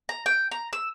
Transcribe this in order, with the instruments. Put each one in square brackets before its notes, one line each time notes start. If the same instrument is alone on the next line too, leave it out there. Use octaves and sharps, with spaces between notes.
[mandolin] A#5
G5
A#5
E6